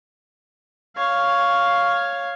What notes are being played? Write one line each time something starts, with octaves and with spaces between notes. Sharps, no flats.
C#5 F5